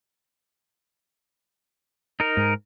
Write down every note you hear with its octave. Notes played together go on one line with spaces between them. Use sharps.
D#4 A#4
G#2